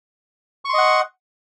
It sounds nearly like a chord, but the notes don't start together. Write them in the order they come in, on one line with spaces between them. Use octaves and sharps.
C#6 C6 D#5 F#5